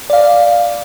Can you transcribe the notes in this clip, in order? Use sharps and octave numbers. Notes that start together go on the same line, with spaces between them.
D5 F5